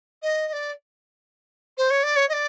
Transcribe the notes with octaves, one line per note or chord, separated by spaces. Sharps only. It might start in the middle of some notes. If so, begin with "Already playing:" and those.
D#5
D#5
D5
C5
C#5
D5
C#5
D#5
D5